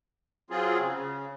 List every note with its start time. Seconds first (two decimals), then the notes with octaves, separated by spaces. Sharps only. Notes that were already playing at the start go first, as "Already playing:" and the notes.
0.50 F#3 C4 F4 G#4
0.80 C#3